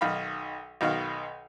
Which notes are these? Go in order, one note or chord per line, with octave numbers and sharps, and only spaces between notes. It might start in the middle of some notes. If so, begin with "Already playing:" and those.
B1 D#3 F5 B5
B1 B2 D#3 F5